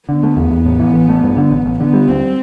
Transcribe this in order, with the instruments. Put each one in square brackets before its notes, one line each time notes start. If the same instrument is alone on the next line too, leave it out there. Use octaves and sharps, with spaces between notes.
[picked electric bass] D3 [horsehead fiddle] B3
[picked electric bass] A3
E2
E2
A2
E3
A1
A3
G2
D3
A1
A1
[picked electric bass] D3 [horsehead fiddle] B3
[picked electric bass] G3
[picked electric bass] D2 [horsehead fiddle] C4